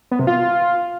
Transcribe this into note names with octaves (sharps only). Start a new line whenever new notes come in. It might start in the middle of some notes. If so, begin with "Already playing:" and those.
B3
C3
F4